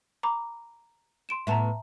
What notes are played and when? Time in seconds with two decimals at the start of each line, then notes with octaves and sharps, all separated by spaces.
0.23 A#5 B5 D6
1.29 C6 D7 E7
1.47 A2 B3 E5 A5 A#5